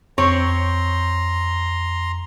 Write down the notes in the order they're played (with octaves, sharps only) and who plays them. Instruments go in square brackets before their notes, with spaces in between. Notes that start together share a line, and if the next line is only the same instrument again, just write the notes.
[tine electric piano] F2 [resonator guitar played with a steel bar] C4 C#5 [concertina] A#5 C6